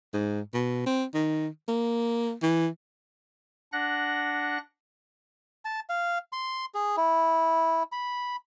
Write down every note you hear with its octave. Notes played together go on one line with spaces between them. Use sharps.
G#2
B2
C4
D#3
A#3
E3
D4 F#5 F#6 A#6
A5
F5
C6
G#4
E4
B5